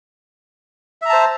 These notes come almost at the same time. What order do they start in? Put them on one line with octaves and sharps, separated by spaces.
E5 A#5 A5 C5